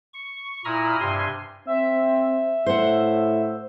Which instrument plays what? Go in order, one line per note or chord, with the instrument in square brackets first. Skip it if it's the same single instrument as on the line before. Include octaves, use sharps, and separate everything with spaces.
[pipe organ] C#6
A#2 E4 A#5 B5 D#6 F6
G2 C3 G#5 C6
[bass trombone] C4 [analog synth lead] E5
[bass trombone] A2 [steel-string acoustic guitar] C5 F#5